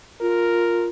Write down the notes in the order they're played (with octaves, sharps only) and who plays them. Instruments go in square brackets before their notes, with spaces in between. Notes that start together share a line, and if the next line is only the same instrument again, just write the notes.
[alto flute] F4 [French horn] A#4